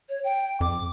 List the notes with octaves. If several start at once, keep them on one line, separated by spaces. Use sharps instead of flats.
C#5
G5
F2 D6